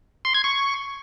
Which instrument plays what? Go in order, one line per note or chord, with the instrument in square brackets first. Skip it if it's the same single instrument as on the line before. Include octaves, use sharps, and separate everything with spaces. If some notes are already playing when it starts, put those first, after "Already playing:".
[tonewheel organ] C6
G#6
C#6